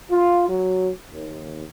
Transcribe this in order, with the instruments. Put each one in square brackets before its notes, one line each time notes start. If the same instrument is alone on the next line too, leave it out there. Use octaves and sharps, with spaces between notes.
[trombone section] F4
F#3
D#2